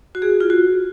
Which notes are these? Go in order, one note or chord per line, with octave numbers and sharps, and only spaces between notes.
F#4
G#4
F4
F#4